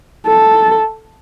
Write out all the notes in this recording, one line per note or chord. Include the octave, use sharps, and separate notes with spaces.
A4